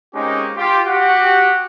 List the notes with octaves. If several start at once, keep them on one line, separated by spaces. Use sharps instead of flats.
G#3 A#3 C4 C#4 D#4 G4
F4 G4
F#4 G4 F#5